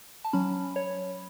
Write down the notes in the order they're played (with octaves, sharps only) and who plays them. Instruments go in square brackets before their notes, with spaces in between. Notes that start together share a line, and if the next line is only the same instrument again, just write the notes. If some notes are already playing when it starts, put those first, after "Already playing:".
[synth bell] A5
F#3 C#4 B5
C#5